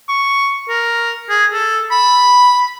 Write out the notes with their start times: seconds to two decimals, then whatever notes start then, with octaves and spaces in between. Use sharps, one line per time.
0.09 C#6
0.68 A#4
1.29 G#4
1.53 A4
1.91 B5